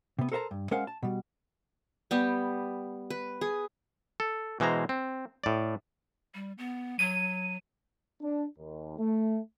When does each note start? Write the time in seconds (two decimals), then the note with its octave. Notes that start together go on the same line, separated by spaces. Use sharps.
0.19 C3 B3
0.32 A4 A#4 C5 E5 A5 A#5
0.51 G2
0.71 G#3 C#4 A#4 C5 F5 F#5
0.87 A5
1.03 B2 G3
2.11 G3 B3 G4
3.10 B4
3.41 G#4
4.20 A4
4.60 B2 E3 G#3 C5 A#5
4.89 C4
5.44 A2 D5
6.34 G3
6.58 B3
6.99 F#3 D#7
8.22 D4
8.58 D#2
8.98 A3